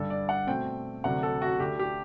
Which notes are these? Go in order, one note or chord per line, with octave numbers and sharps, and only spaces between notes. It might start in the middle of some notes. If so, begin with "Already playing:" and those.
Already playing: G2 D3 G3 D4 A4
D5
F#5
B2 A3 C4 G5
D2 C3 F#3 A3 D4 F#5
A4
F#4
D2 D3 A3 G4
G4